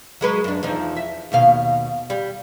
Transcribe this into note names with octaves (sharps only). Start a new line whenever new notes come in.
F#3 G#3 B4
F#2 D4
E2 F3 D#4
E5
D#2 B2 F5
G3